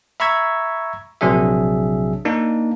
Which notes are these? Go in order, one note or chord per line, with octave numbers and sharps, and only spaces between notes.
E5 A#5 B5 C#6 E6 G#6
A#1 C3 F#3 D4 G#4 E5
A#3 D4 D#4